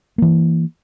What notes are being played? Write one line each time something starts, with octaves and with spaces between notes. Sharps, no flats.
E3 A#3